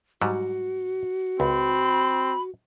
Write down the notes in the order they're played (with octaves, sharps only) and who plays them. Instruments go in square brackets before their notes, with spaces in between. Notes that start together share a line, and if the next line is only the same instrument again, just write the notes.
[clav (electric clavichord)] G#2 F#3 G3 [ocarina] F#4
[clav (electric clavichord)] C#2 [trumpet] C4 [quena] B5